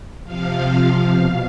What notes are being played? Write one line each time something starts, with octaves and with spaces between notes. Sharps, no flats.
C3 F3 F5
B2